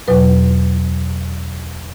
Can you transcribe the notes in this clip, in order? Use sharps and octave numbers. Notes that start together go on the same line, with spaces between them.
E2 B2 F#3 B4